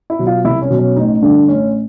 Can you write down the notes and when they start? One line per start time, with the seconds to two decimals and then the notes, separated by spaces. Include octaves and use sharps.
0.10 E4
0.19 B2 F#3
0.27 F4
0.45 C2 E4
0.62 C#4
0.70 B2 F#3
0.79 C#4
0.96 A1 D#4
1.22 G2 D3 D4
1.48 A1 C#4